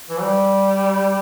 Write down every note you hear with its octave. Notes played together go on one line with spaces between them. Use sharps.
E3
G3